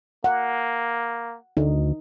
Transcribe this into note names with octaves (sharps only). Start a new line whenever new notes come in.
A#3 F#5
D2 D#4